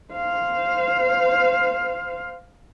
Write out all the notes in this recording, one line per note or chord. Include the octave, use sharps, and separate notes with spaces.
C5 F5